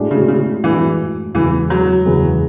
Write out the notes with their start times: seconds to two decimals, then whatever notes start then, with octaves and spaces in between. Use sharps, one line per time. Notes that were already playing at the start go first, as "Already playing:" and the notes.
Already playing: A2 G#3 D4 F#4
0.11 C#3
0.28 C#3
0.63 A2 E3 G#3 D4 F#4
1.34 E2 C#3 E3 G#3 B3
1.70 F#3
2.06 E2 C#3 G#3 B3